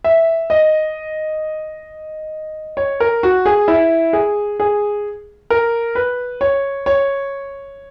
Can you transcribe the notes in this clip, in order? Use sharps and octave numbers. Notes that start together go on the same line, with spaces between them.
E5
D#5
C#5
A#4
F#4
G#4
E4
G#4
G#4
A#4
B4
C#5
C#5